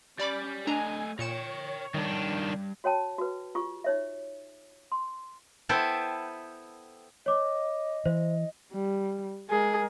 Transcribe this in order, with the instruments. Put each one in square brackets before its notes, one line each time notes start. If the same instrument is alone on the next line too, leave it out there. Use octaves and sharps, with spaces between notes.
[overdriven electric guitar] G3 [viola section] C#4 [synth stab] D5 B5 D6
[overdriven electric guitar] A3 D#5 [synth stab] D4 A#5 [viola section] G#5
[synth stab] A#2 C#7 E7 [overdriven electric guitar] A#4 G5 [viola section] C#5
[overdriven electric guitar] G2 [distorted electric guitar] D#3 D4
[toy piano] F#4 C#5 G5 A5
F#4 B4
F4 G4 C#6
D#4 C#5 E5
C6
[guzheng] B3 E4 A4 C5 E5 G5
[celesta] C#5 D6 [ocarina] D#5
[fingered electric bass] E3 [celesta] C5 E5
[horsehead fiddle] G3
[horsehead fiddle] G#3 A#4 [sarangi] G#4